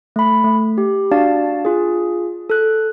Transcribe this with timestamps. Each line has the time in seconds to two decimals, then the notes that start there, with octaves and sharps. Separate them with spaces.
0.16 A3 B5
0.44 A3
0.78 G4
1.11 D4 F#4 D5 F5 A5 A6
1.65 F4 G#4
2.50 A4 F#6